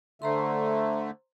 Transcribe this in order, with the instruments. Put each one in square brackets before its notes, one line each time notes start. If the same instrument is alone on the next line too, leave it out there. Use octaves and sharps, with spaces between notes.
[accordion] D3 A3 [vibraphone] C5 A#5 C6